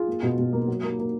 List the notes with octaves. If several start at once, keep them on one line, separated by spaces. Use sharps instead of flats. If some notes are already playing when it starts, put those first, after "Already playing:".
Already playing: F4 G#4
A#3
B2
B2
A#3
F#3
A#3
A#3